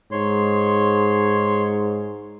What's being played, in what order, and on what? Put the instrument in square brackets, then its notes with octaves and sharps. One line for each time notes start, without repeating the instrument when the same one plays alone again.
[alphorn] G#2 [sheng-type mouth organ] C#5 C6